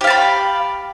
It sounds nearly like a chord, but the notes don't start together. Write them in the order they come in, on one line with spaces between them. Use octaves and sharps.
G4 F5 A5 B5